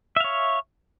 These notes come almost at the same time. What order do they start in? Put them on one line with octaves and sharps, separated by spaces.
E5 F5 C#5